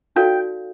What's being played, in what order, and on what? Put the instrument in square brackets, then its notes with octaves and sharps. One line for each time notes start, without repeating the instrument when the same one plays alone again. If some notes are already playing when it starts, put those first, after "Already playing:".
[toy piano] D#4 F#4 A4 D5 F5 [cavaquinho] G5